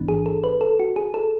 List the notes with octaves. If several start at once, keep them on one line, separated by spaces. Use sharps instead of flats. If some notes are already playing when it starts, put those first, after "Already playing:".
Already playing: A1 G#2 E3 B3 D4
G#4
A4
B4
A4
F#4
G#4
A4